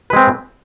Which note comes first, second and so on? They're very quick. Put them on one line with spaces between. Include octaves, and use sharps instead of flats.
B4 G#3 C4